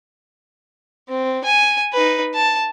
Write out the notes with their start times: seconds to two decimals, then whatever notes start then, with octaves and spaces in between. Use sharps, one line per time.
1.09 C4
1.44 G#5
1.93 D#4 B4
2.35 A5